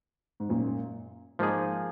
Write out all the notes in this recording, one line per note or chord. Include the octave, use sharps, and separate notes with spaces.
G#2
F#2 A#2
G#2 F3 A#3 D#4 G#4